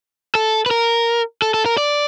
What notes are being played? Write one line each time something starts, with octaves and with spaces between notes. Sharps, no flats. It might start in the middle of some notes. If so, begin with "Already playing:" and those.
A4
B4
A#4
A4
A4
A#4
D5